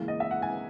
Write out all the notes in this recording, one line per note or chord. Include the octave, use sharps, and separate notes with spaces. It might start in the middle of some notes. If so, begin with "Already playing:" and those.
Already playing: C#2 C#3 E3 A#3 E4
D#5
E5
F#5
G#5